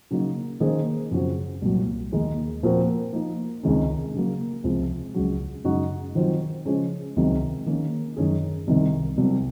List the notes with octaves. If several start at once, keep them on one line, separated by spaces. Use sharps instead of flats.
C#3 F#3 A#3 D#4
D#3 A#3 C#4 G#4 C5
F#2 C#3 F#3 C4 F4
C2 A#2 F#3
D#2 D#3 G#3 D#4
A#2 F3 C4 F#4 A#4
F3 A#3 D#4
C#2 C3 D#3 G#3 C#4
C#3 F#3 A#3
C#2 C3 F3
C#2 C#3 F#3
F#2 C#3 G#3 D#4 F#4
D#3 F#3 C4 F4 C5
C#3 F3 G#3 C#4
C#2 C3 D#3 F#3
D#3 A#3 C#4
F#2 D#3 G#3 C#4 G#4
C2 C3 D#3
C2 C3 F#3